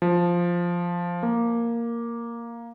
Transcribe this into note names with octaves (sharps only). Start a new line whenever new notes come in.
F3
A#3